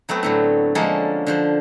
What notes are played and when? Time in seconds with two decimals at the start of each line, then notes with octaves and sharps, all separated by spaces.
0.09 F#3 A3 B3 C4
0.23 A2 D3 F#3
0.75 D3 F3 G#3 A#3 C#4 A4
1.27 D3 F3 C5